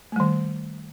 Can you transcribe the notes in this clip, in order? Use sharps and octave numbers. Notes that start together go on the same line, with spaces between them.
D#3 G3 A3